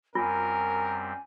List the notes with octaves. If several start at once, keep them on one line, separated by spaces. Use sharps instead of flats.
F#2 G3 C4 F4 A#4 G#5